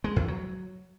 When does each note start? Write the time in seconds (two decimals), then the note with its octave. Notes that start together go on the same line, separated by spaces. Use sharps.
0.04 G#3
0.16 E2
0.28 F#3